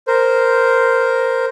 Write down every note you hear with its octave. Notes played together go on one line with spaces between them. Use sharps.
A#4 C5